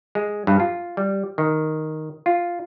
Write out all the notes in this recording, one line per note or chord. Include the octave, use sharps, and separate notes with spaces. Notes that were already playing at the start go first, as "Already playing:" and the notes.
G#3
G2
F4
G3
D#3
F4